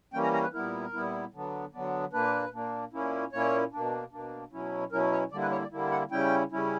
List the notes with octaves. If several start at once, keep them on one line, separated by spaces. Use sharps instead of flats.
E3 G3 A#3 C#4 G5
A#5
A#5
B4
A#2 G3 B3 E4 A#4
A#2 G3 B3 E4
D3 F#3 B3 D4
D3 F#3 B3 D4
A#2 A#3 D4 B4
A#2 A#3 D4
A#2 A#3 C#4 E4
A#2 A#3 C#4 E4 C#5
B2 A#3 D4
B2 A#3 D4
B2 F#3 C#4 E4
B2 F#3 C#4 E4 A#4
C#5
D3 G3 A#3 E4 D5
B4
C#5
D5
D3 G3 A#3 E4
F#5
C#3 G3 C#4 E4 G5
C#3 G3 C#4 E4